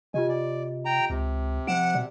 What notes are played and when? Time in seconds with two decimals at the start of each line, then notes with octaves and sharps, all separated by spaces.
0.14 C3 F4 G4 D#5 G#5
0.29 D5
0.85 G5 A#5
1.10 C#2 C3
1.67 F3 F#5 D7 E7
1.95 B2 D5